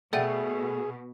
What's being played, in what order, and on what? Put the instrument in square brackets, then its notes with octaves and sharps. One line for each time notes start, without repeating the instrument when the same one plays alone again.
[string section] B2 [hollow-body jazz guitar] A3 [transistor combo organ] G#4 [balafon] D5 F#5 G5